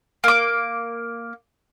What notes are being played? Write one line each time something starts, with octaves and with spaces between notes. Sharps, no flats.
A#3 D6